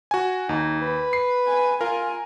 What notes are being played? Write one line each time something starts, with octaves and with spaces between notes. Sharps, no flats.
F#4 G#5
D#2 D#4
B4
C7
G#5
F4 A#4 G#5